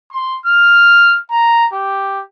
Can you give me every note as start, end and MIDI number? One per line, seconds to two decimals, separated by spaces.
0.11 0.39 84
0.46 1.19 89
1.31 1.67 82
1.73 2.22 67